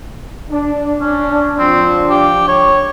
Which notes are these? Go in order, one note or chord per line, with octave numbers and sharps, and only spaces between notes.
D4
C#4 D4
F3 C4 D4
G4
C#5